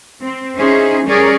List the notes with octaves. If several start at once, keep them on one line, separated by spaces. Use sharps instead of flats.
C4
C#4 D#4 E4 G#4 C5
G3 C#4 G#4 A#4 C#5 D5